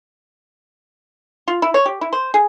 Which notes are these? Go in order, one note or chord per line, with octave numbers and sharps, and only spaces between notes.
F4
E4
C#5
G4
E4
C5
G#4